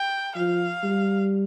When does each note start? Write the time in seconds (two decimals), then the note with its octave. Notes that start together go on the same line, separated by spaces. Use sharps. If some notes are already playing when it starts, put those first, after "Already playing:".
Already playing: G5
0.36 F3 F5
0.83 G3